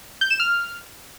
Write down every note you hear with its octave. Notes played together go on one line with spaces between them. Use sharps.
G6
E7
F6